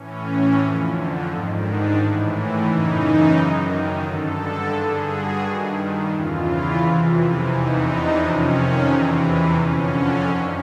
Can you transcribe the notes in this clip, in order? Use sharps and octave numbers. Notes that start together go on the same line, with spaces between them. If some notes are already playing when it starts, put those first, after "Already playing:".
Already playing: A2 E3 C#4
F2 D3
G#2 D#3 D4
D4
A2 E3
F#2 C#3 E3 D#4
F#2 D#3
G2 D3 A4
G2 D3 G#4
F#4
G2 D#3
E2 C#3 E3 F4
E4
F2 C3 E3
E2 C3 E3 D#4
D4
F2 C3 D#3 C#4
E2 C3 E3
F2 D3 C#4
F#2 D#3